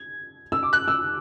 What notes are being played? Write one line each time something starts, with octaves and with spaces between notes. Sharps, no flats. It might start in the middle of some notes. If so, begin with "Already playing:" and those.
Already playing: G#6
E6
D6
F#6
E6